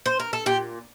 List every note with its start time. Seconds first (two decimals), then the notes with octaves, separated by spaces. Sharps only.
0.06 C5
0.20 A#4
0.33 A4
0.46 A#2 G4